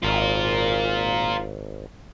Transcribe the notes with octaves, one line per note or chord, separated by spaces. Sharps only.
G#1 F4 A#4